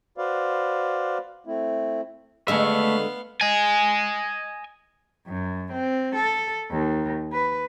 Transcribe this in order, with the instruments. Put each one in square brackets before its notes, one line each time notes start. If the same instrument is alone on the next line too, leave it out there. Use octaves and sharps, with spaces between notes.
[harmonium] F#4 B4 C5 D5 F5
A3 C4 E4
[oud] D#2 D3 G#3 [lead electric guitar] A3 E5 [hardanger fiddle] B3 F5
[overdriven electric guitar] D#5 G#5
[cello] F#2
C4
A4
D#2
B4